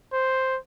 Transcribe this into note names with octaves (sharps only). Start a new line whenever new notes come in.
C5